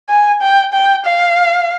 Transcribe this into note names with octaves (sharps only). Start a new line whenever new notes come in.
G#5
G5
G5
F5